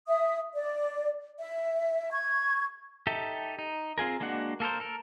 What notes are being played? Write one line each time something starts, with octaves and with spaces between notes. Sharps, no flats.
E5 D#6
D5
E5
C#6 G#6
D#4 G4 A4 E5
D#4
C4 F4 G#4 A#4
G#3 A#3 D4 F#4 F#5
A#3 A4 A#4 C5
A4 A#4